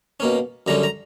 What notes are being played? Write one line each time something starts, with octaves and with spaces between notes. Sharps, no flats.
B2 A#3 C#4
F#2 D3 G3 C#4 A#5
A#5